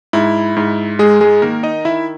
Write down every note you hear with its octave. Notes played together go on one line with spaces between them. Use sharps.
G#2 E4
G#2
G#3 G#4
G#3 G#4
D#3 A#3 A#4
D#4 D#5
D#3 E4 E5